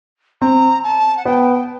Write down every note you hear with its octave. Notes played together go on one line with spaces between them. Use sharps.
C4 A#5
A5
F#5
B3 G5